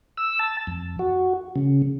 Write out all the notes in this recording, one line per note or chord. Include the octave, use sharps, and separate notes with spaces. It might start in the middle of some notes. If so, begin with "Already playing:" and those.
E6
A5
F2
F#4
C#3